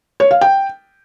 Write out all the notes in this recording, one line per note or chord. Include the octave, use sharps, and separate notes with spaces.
C#5
F5
G5